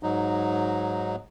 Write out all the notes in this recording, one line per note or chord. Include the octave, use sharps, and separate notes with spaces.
G#2 F#3 D#4